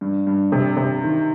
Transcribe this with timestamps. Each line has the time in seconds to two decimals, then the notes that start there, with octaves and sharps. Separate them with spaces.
0.01 G2
0.27 G2
0.52 C3
0.77 C3
1.03 D#3